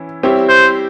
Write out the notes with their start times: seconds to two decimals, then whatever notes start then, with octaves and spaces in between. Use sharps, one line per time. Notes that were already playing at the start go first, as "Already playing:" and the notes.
Already playing: E3 C#4 E4
0.23 G3 C4 E4 G4 C#5
0.49 C5